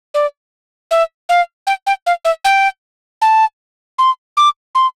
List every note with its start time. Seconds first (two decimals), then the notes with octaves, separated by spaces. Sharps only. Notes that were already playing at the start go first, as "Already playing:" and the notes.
0.14 D5
0.91 E5
1.29 F5
1.67 G5
1.87 G5
2.06 F5
2.25 E5
2.45 G5
3.22 A5
3.99 C6
4.37 D6
4.75 C6